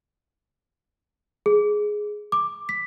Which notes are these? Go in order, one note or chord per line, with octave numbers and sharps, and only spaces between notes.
G#4
D6
B6